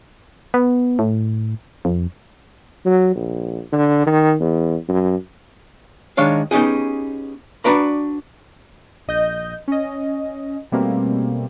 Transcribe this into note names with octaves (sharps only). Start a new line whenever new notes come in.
B3
A2
F2
F#3
A#1
D3
D#3
E2
F#2
D#3 G#3 D4 C#5 F5
B3 C#4 D#4 G4 G#4
D4 F#4 B4 D5 A#5 B5
A#1 D#5 G6
C#4 D#5
B2 G3 A3 A#3 C4